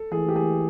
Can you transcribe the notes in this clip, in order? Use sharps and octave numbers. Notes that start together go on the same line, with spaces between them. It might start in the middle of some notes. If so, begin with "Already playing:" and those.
Already playing: A4
E3 G#4
G4
G#4